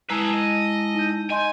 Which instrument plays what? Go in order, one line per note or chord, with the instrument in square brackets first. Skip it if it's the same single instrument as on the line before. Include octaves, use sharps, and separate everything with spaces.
[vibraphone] G#3 E4 A5 [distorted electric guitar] G#4 B4 [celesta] A#5
[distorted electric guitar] D#5
[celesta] D#4 G6
[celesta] D#5 C6 G6 [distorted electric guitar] G#5